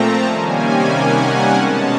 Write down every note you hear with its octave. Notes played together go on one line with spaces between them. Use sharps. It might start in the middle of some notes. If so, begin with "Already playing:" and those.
Already playing: A#2 F3 A3 C4 A5 A#5
C3 D#3 G3 A#3 C#4 G#5
F#5
G#5
B2 G#3 C#4 A5